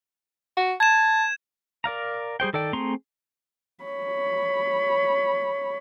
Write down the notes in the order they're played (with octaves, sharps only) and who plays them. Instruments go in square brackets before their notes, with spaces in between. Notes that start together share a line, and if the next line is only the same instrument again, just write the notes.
[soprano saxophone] F#4
[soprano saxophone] A5 [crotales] G#6 E7
[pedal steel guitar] A#4 D5 F5 A#5
G3 G#4 C5 G5
D#3 A4 D5 G5
A3 C4 G#4 A#5 C6
[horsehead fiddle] C#5 B5